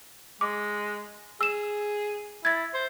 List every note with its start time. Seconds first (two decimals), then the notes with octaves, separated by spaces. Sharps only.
0.41 G#3 D6
1.41 G#4 E6 E7
2.45 E4 G#6 A6
2.74 C5